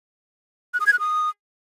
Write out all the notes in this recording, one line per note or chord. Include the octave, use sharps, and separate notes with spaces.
F#6
D#6
G#6
F#6
D#6